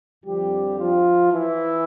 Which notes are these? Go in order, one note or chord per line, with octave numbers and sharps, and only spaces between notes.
F2 D3 F3 G3 G4
F3 F4
E3 E4